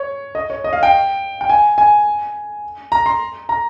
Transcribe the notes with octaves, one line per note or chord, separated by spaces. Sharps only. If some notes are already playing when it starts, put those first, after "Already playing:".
Already playing: C#5
D#5
C#5
D#5
F5
G5
G5
G#5
G#5
A#5
C6
A#5